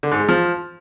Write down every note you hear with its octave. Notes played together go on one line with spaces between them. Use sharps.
D3
G#2
G#3
F3